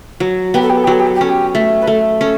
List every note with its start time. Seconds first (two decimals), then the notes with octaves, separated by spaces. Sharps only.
0.20 F#3
0.54 B3 G4
0.62 A4
0.69 G4
0.77 A4
0.84 G4
0.87 F#3 A4
0.99 G4
1.07 A4
1.15 G4
1.21 C#4 A4
1.29 G4
1.55 A3
1.81 B4
1.87 A3 A4
2.21 C#4 A4